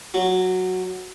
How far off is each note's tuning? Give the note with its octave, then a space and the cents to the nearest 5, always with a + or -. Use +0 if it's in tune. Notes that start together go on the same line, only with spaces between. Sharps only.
F#3 -5